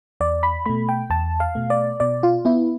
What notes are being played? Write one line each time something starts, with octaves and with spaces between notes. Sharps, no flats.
E2 D5
B5
B2 A3 B5
G5
E2 A5
F5
B2 A3
D5
B2 D5
F4
B3 E4